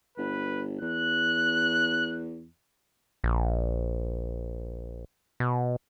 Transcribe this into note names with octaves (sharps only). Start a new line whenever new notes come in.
G1 B4
E2 F#6
A#1
B2